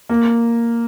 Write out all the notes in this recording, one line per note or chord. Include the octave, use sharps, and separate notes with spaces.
A#3